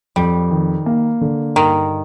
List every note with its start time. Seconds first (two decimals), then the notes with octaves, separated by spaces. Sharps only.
0.16 F2 G3
0.51 D#3
0.86 A#3
1.21 D3
1.56 G2 D#3